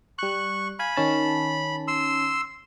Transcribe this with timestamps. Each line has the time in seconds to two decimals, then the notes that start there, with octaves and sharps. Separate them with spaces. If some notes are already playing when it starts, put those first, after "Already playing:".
0.19 G3 C#6 F#6
0.79 F5 G#5 B5
0.96 D#3 C#4 A5
1.88 C6 E6